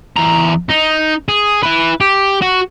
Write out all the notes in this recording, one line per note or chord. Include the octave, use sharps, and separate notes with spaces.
E2 A#5
D#4
G#4
E4 B4
G4
F#4